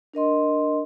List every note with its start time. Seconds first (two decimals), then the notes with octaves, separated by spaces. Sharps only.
0.14 D4 A#4 D#5 C6